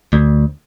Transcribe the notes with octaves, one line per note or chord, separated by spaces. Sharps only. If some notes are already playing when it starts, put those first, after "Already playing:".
D2